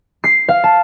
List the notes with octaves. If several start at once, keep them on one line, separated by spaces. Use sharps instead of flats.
C7
F5
A5